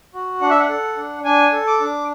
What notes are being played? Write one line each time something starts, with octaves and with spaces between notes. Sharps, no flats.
F#4
D4 F#5
E5
F#5
A4
D4
D4 G#5
A4
D6
D4